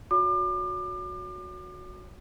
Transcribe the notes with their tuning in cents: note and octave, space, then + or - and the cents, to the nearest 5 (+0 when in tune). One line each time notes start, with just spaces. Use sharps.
F#4 -20 C#5 +35 D6 +40